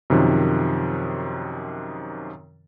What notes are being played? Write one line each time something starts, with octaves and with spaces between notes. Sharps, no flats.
F#2 C3 D#3 F3